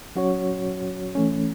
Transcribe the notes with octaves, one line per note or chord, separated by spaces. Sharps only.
F#3 C#4 F#4 C#5
E3 A3 C#4